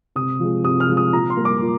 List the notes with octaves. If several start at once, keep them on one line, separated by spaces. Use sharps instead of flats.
C3 D#6
F3 G#3
C3 D#6
F6
F3 G#3
D#6
A#2 A#5
C6
G3 A#3
D6
A#2